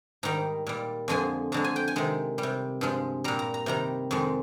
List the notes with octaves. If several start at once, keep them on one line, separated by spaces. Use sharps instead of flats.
G#2 D#3 G3 A#5
A#2 G3
F2 D3 F3 G#3 G#5
F2 D3 G#3 A#5
G#5
G5
G#5
C3 D#3 G#3
G3
C3
G2 F3 G#3
A#2 G3 A#5
A#5
A#5
C3 D#3 G3 A#5
F2 D#3 G#3